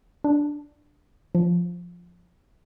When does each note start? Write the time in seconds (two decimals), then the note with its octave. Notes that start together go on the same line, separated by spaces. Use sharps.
0.24 D4
1.35 F3